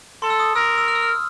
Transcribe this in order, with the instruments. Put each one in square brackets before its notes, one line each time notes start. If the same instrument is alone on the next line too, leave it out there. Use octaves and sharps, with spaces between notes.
[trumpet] A4 [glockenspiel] C6
[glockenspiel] E6
D#6
[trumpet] A#4 [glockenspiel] E6
[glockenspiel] E6
F6
E6
F6